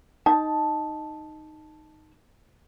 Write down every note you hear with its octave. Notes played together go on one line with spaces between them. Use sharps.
D#4 A5